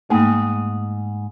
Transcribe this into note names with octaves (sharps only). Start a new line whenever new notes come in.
G#2 A3 A#3 D#4 G#4